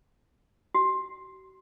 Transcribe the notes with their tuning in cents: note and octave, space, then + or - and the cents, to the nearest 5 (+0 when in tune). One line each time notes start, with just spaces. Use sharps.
F#4 +45